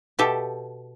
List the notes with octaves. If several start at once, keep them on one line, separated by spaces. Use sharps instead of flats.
B2 G4 A4 E5